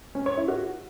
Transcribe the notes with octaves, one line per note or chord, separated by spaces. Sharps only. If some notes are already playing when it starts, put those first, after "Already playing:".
C#4
C#5
E4
F#4